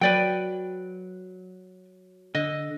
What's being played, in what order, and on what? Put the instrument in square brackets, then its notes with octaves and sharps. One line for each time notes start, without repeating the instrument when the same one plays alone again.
[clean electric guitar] F#3 [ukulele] B4 D5 G5
[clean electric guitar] D3 [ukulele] D#5